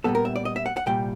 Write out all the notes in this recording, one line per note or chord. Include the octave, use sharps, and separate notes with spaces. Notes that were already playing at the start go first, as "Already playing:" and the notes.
A#2 G3 B3 A4
A#4
E5
D5
D#5
E5
F#5
F#5
C2 A#2 G3 G5